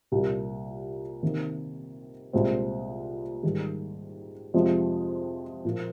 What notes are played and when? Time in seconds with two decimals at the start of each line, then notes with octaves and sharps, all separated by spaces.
0.12 C2 A#2 G3 A#3
1.22 C3 D#3 A#3
2.33 C2 A#2 G#3 C4
3.43 G#2 D#3 G3
4.54 F2 C3 F3 G#3
5.65 A#2 F3 A#3